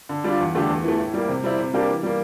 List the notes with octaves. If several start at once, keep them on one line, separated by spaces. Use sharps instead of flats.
D3
G3 D4 F4
E2
D3 A3 D4 G4
E2
E3 A3
A2
G3 A#3
C3
G3 C4 E4
C3
G3 A#3 D4 G4
E3
G3 A#3